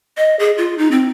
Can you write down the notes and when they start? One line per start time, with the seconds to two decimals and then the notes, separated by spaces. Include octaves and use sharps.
0.17 D#5
0.39 G#4
0.58 F4
0.78 D#4
0.91 C4